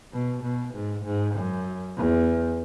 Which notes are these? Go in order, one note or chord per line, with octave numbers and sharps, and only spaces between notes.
B2
B2
G#2
G#2
F#2
E2